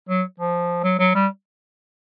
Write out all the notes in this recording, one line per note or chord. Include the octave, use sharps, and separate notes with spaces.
F#3
F3
F#3
F#3
G3